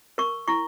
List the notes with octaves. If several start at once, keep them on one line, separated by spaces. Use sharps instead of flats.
A#4 C#6
E4 C#6